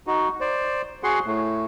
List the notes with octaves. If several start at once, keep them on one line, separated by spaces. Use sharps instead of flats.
D#4 F#4
C5 D5
F#4 G#4 F#5 C6
A2 A3